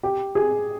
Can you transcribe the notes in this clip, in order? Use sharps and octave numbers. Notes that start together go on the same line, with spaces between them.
G4
G#4